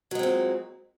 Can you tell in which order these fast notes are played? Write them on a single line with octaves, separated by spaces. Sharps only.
F#3 G#3 C4 A#2